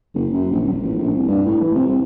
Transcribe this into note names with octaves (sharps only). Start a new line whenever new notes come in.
F#1
F#2
A#1
D#1
A1
A#1
C2
G2
A2
E3
C3
C2